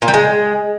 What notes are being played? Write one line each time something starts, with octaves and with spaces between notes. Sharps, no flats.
A#2
G3
G#3